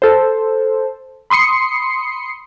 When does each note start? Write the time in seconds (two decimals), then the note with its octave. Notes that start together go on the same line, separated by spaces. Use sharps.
0.02 A4 C5
1.30 B5 C6 D#6 C7 C#7